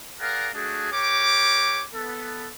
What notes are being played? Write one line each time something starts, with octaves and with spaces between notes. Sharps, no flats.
G#4 A#4 D5 F5 F#5
A3 D4 F#4 G#4
G4 A#4 C#5 D6
B3 A4